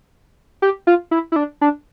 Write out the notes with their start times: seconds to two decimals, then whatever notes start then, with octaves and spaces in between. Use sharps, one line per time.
0.62 G4
0.87 F4
1.11 E4
1.32 E4
1.36 D4
1.61 D4